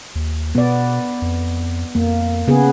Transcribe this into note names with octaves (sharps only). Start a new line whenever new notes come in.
D#2
B2 B3 D5
F2
F2 A#3
C#3 B3 G#4